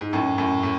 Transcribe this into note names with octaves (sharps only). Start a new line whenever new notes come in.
G#2
F#2 A2
F#2 A2
A2